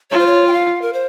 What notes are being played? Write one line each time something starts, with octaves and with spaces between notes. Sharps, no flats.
F4 C#5
C5
C#5
G5
F5
A#4
C5